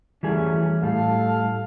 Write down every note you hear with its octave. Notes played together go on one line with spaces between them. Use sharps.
E3 F#3 G3 A3 C#4 G#4
A2 G3 A4 F5